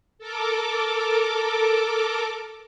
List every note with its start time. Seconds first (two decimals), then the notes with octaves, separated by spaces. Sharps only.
0.19 A4 A#4 D6